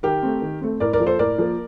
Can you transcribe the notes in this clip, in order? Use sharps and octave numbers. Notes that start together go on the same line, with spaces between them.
D#3 G4 A#4
A3 C4
D#3
A3 C4
A2 A#4 D5
A#4 D5
F3 A#3
A4 C5
A2 A#4 D5
F3 A#3